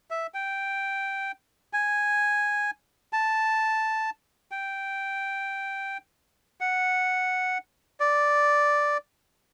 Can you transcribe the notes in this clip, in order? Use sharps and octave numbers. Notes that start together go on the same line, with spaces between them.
E5
G5
G#5
A5
G5
F#5
D5